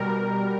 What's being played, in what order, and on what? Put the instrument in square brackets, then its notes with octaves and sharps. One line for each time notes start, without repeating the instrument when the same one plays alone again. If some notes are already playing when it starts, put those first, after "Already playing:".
Already playing: [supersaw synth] B2 G3 A#4